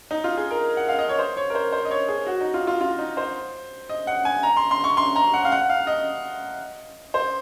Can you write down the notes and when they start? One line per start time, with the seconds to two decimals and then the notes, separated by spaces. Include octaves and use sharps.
0.11 D#4
0.24 F4
0.37 G#4
0.51 A#4
0.77 F#5
0.88 F5
0.99 D#5
1.09 C#5
1.19 C5
1.37 C#5
1.50 A#4
1.55 C5
1.72 C5
1.85 D#5
1.91 C#5
2.08 G#4
2.26 F#4
2.41 D#4
2.54 F4
2.67 F4
2.81 F4
2.99 D#4
3.17 C5
3.89 D#5
4.07 F#5
4.25 G#5
4.43 A#5
4.57 C6
4.71 C6
4.84 C#6
4.97 C6
5.16 A#5
5.34 F#5
5.45 F5
5.52 F#5
5.70 F5
5.87 D#5
7.14 C5